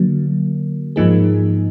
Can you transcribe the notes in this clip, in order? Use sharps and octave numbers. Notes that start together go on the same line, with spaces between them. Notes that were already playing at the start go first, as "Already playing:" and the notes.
Already playing: D3 F#3 A#3
G#2 F3 A#3 D#4 G#4